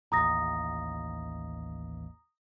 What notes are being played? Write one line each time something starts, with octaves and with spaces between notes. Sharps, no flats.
A1 D#2 A#5 D#6 A#6